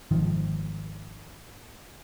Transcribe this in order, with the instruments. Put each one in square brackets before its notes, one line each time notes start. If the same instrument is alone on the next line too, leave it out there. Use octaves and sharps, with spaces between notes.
[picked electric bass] G#1 D#3 F3